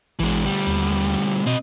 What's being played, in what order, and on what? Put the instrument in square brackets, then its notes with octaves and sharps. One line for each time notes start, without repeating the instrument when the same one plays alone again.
[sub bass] A1 [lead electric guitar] E3 G#3
[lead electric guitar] D2 G3
[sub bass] D#2
[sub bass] B2 [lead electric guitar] C4 D#5